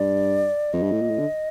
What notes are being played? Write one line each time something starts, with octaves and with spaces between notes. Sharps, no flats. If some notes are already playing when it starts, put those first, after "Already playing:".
Already playing: G2 D5
F2 D#5
G2
A2
A#2
A2
D3